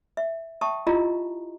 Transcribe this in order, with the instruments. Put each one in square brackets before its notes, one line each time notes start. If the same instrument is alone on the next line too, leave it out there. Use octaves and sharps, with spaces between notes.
[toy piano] E5
E5 G5 A5 C#6 D#6
E4 F4 G4 D#5 F5 A#5